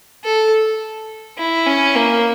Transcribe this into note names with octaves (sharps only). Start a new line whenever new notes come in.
A4
E4
C#4
A#3